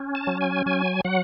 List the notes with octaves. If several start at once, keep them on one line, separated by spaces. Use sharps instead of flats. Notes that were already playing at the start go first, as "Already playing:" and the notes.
Already playing: C#4
A5
F#3
G#5
F#3 G#5
F#3 F#5